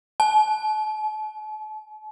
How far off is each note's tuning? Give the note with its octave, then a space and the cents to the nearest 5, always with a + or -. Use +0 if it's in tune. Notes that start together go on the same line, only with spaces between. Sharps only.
A5 -40